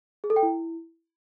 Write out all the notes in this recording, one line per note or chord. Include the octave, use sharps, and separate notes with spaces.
G#4
A4
G5
E4